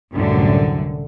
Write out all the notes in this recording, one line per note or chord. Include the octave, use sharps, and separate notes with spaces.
C2 F#2 A2 D3